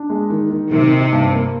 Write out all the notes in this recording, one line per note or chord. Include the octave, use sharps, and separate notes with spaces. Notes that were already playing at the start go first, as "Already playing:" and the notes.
Already playing: D4
G#3
D#3
D#3
C3 D#3
D#4
G2
A#3